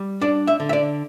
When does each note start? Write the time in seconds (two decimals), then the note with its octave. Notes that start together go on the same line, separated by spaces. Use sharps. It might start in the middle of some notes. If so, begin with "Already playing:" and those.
Already playing: G3
0.21 D4 D5
0.47 E5
0.60 D3
0.69 E5
0.73 D5